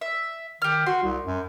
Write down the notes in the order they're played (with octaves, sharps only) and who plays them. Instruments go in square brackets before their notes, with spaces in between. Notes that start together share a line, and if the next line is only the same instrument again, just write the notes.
[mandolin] E5
[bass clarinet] D#3 [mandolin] G4 F6
[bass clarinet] F#4 [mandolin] C6
[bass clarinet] C2
F#2